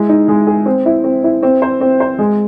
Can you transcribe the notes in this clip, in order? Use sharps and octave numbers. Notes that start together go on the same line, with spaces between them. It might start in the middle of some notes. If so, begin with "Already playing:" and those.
Already playing: G#3 E4
D#4
G#3
G#4
C4
E4
C4
E4
C4
C5
C4
C5
G#3